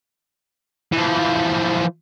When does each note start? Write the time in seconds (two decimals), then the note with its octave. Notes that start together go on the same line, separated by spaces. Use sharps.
0.93 E3 F3